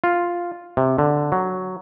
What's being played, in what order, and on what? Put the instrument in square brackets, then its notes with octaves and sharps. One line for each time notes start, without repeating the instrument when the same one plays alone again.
[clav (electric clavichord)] F4
C3
D3
F#3